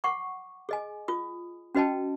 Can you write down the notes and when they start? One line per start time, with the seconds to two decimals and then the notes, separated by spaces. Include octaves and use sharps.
0.04 F#5 C#6 D6
0.69 G#4 D#5 G#5
1.08 F4 D#6
1.75 C#4 F#4 B4 D#5 G5 A5